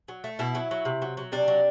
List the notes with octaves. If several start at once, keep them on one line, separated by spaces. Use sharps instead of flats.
F#3
A3
B2 E4
F#3
F#3
C3
F#3
F#3
C3 D4
F#3